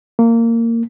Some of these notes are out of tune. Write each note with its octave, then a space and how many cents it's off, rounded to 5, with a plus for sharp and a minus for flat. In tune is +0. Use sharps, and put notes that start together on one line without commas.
A#3 -20